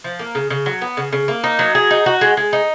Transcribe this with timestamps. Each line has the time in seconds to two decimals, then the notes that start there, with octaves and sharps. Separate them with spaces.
0.04 F3
0.19 A#3
0.35 C#3
0.50 C#3
0.66 F#3
0.82 B3
0.97 C#3
1.12 C#3
1.28 A#3
1.44 D#4
1.59 F#3
1.75 G#4
1.91 D#4
2.06 F#4
2.21 G#3
2.37 G#3
2.53 D#4